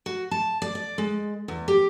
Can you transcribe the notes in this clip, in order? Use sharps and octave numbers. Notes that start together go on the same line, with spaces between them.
F#4
A5
D5
D5
G#3
E2
G4